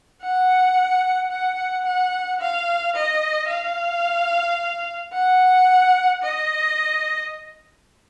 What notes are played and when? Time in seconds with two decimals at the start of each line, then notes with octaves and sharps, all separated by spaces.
0.22 F#5
1.31 F#5
1.85 F#5
2.40 F5
2.95 D#5
3.49 F5
5.13 F#5
6.23 D#5